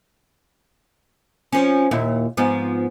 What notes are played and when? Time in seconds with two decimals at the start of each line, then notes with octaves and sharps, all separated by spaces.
1.52 F3 C#4
1.91 D#2 A#2 E4
2.37 G#2 F3 B3